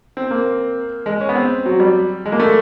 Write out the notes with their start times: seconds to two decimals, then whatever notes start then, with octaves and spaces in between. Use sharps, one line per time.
0.17 C4
0.31 A#3
1.06 G#3
1.21 C#4
1.29 B3
1.35 C4
1.66 F#3
1.80 G3
2.26 G#3
2.32 A#3
2.40 A3